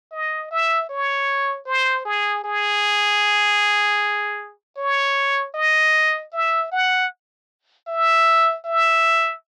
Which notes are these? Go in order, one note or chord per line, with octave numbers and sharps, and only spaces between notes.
D#5
E5
C#5
C5
G#4
G#4
C#5
D#5
E5
F#5
E5
E5